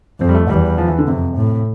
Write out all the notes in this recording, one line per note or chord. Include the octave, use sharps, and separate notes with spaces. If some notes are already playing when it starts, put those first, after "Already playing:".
F2 C4
G3
A3
E2 G3
F3
E3
D3
F2 C3
A2